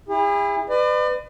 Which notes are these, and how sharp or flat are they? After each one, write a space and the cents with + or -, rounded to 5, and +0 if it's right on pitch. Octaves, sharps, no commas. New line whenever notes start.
E4 -5 G#4 -45
B4 +30 D5 +40